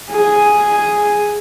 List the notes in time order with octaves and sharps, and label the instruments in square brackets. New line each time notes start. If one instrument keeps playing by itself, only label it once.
[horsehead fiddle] G#4